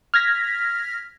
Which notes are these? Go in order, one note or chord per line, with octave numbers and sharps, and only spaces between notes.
F6 G#6 A#6 B6